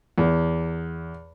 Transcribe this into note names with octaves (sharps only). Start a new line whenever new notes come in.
E2